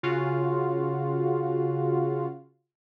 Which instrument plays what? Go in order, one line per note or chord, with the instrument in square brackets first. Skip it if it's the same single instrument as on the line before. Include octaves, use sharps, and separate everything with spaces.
[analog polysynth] C#3 F4 F#4